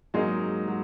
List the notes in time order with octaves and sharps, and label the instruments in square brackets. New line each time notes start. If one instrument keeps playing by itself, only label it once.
[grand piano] G#2 F#3 A#3 D#4 [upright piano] G#3
[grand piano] F#3